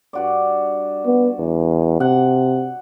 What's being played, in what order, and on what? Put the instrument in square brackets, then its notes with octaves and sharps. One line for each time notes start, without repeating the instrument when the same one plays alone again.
[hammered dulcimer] G2 F#4 D5
[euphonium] B3
E2
[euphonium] C3 [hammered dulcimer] F#5